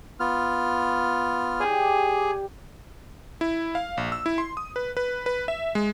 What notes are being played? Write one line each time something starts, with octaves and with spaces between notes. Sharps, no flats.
B3 F4 F6
G4 G#4 D5
E4
F5
A#1
E6
E4
C6
D#6
B4
B4
B4
E5
G#3